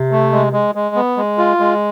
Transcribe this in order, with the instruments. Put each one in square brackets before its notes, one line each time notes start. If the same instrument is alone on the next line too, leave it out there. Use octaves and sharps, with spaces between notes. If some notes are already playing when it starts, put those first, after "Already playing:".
Already playing: [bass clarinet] C3
[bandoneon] A3
G#3
G#3
G#3
B3
G#3
F4
G#3